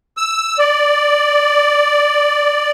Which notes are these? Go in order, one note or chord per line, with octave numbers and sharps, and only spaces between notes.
E6
D5